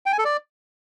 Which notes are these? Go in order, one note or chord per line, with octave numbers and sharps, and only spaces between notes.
G5
G#5
A4
D5